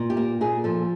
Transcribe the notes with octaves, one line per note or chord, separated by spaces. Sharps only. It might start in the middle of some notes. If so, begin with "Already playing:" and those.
Already playing: A#2
G4
A#3
A#2 G#4
F3 A4